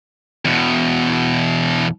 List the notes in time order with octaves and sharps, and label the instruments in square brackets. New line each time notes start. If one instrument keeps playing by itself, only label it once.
[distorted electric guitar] E2 B2